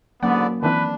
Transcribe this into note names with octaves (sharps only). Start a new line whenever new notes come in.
G#2 D3 F#3 A#3 B3 C#4 D5 F#5
D#3 E3 C4 D4 B4